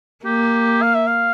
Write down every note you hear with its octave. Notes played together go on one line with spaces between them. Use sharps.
A#3 G4
F5
E5
F5